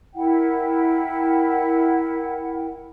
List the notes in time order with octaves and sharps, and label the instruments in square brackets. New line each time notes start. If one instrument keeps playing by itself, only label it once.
[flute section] E4 A#4 F#5 G5